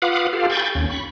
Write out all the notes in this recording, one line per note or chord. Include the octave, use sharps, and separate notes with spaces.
F4 B4 F5 F#5 D6 D#6
F4 G4 A4 F5
G5 G#5 B5 C#6 G6 A6
D#2 C#4
B5 C#6